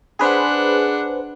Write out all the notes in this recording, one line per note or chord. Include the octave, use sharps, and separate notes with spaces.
D4 G#4 B4 C5 F#5